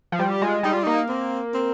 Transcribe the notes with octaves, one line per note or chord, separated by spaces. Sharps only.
F3
G3 F4
G4
G#3 F4
G3 D#4
F4
A#3 D#4
C4
C4